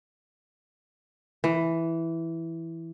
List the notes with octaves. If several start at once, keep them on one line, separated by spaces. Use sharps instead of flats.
E3